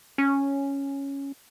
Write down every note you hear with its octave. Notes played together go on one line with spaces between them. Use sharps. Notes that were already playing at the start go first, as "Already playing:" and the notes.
C#4